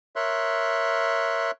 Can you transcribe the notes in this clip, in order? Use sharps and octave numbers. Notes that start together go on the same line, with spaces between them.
A#4 C#5 E5 C6 F#6